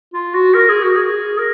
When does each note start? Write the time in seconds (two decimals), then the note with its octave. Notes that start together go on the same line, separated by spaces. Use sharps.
0.14 F4
0.34 F#4
0.55 A#4
0.69 G#4
0.82 F#4
0.96 G#4
1.38 A#4